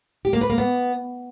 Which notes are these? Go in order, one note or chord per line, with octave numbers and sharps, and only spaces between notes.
G4
A#3
B4
A#3
B3